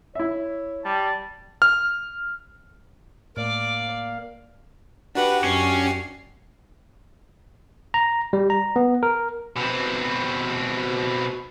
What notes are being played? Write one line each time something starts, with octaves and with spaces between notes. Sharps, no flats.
E4 C#5 E5
G3 A5
F6
A2 A#3 D5 F5
D4 F#4 G4 B4 F#5
F#2 C#4 C7
A#5
G3
A#5
B3
A#4
B2 C4